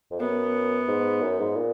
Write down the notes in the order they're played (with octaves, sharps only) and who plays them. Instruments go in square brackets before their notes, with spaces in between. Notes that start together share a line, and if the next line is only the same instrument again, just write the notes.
[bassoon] F2
[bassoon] F#2 [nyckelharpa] B3
[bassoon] G#2
F#2
G#2
A#2